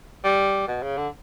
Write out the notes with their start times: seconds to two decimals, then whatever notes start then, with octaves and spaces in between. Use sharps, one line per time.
0.24 G3
0.68 B2
0.83 C#3
0.97 D3